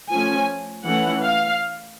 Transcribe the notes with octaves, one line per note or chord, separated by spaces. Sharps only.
F3 A3 C#4 G#5
E3 A3 C#4 F#5
F5